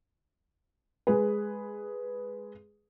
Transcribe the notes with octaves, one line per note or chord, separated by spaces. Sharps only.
G#3 G#4 B4